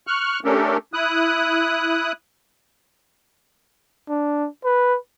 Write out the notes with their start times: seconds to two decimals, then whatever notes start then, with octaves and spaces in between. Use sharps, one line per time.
0.07 C#6 F6 F#6
0.45 A3 C#4 D4 G4 A4 A#4
0.94 E4 D#6 F#6
4.09 D4
4.64 B4